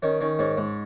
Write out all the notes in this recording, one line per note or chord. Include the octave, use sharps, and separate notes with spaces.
D#3 C#4
D#3 C#4
G#2 C#4
G#2